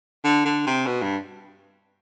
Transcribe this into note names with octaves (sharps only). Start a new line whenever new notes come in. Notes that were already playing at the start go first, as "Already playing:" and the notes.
D3
D3
C3
B2
G2